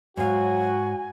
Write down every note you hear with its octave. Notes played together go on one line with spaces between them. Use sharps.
G#2 F#3 F#4 F5 G#5